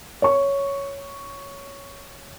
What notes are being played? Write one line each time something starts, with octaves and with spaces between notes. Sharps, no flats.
C#5 C#6